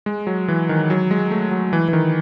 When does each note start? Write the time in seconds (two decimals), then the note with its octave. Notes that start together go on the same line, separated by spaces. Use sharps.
0.06 G#3
0.27 F#3
0.48 E3
0.69 D#3
0.90 F#3
1.11 G#3
1.31 A3
1.51 F#3
1.73 E3
1.88 E3
1.93 D#3